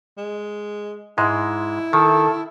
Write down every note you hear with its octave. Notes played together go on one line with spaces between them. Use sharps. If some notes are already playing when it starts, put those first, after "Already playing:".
G#3
G#2 G#3 E4
D#3 A4